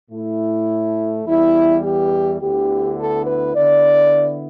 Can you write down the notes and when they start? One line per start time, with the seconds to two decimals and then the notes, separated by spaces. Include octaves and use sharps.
0.10 A2 A3 E4
1.25 E2 E3 G3 B3 E4
1.83 G4
2.40 D2 D3 B3 E4 G4
2.98 A4
3.26 B4
3.55 D3 B3 E4 D5